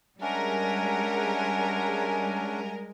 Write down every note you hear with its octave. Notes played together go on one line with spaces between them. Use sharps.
G3 G#3 C#4 D4 A#4 E5 F#5 G#5